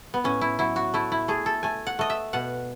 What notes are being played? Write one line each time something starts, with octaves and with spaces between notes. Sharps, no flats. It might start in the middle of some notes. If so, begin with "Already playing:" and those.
B3
A2 C#4
E4
F#3 E4
F#4
A3 E4
E4
A3 G#4
A4
A3 G#5
F#5
A3 D#5
E5
B2 F#5